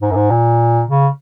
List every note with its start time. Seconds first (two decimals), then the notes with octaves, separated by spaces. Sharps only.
0.02 G#2
0.11 F#2
0.15 G#2
0.30 A#2
0.88 C#3